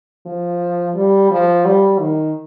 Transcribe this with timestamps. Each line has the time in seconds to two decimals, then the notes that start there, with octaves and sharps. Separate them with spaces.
0.26 F3
0.95 G3
1.31 F3
1.65 G3
2.00 D#3